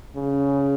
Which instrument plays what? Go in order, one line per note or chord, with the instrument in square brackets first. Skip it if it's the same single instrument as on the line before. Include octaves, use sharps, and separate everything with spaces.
[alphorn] C#3